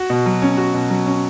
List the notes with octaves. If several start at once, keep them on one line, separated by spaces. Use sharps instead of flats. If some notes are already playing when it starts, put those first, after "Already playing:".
Already playing: F#4
B2
F#3
C#4
F#4
B2
F#3
C#4